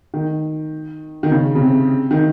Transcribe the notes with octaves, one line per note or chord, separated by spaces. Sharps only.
D#3
D#3
C#3
C#3
C3
D#3